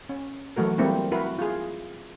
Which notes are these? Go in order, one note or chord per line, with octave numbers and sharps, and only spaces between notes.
C#4
E3 F#3 A3 F#4 A#4
G3 A#3 C4 E4
E4 F#4 A#4 B4
F4 G#4